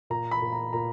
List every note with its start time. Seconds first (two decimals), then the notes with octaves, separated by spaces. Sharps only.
0.10 A#2 A#5
0.31 B5
0.42 A#2
0.53 A#5
0.73 A#2 A#5